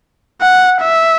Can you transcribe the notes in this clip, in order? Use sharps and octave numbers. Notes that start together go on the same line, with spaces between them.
F#5
E5